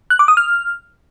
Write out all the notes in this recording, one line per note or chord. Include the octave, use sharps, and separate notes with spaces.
F#6
D6
D#6
F6